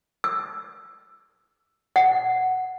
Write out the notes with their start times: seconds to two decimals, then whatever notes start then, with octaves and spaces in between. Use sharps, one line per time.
0.24 E6
1.96 F#5